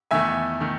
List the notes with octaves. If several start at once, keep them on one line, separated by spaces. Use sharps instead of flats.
E2 D#3 A3 E5 G#5
D#3 A3